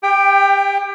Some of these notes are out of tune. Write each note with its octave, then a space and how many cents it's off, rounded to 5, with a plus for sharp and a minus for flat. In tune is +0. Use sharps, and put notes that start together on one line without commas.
G4 +30 G5 +0